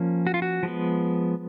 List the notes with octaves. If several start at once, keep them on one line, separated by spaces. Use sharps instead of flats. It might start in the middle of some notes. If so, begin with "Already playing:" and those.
Already playing: F3 A#3 C#4
F#4
F4
F#4
F3 G#3 B3